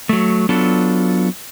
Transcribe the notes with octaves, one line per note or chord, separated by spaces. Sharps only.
F#3 A3
F#3 B3 D4 F4 A4